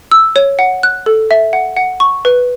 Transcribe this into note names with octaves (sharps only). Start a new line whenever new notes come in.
E6
C#5
F#5
F#6
A4
E5
F#5
F#5
C#6
B4